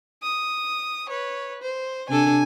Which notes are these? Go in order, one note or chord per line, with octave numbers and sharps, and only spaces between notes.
D#6
B4 C#5
C5
C3 D4 A4 G#5